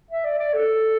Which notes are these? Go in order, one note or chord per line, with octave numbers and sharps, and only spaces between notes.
E5
D5
D5
A4